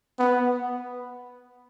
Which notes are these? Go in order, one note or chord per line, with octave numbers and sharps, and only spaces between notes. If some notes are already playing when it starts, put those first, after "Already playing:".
B3